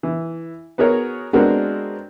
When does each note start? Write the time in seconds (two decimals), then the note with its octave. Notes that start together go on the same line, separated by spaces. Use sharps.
0.03 E3
0.78 B3 F#4 G#4 A#4 C#5
1.33 G#3 B3 C4 D4 F#4 A#4